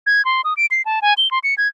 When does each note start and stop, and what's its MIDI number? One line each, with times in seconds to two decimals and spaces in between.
0.06 0.24 92
0.25 0.41 84
0.44 0.54 87
0.57 0.66 98
0.71 0.82 96
0.86 1.00 81
1.02 1.14 80
1.18 1.30 103
1.31 1.39 84
1.44 1.54 97
1.58 1.68 92